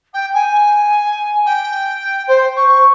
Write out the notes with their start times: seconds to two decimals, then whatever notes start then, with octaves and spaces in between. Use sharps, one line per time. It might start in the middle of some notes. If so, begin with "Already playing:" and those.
0.13 G5
0.34 G#5
1.46 G5
2.27 C5
2.56 C#6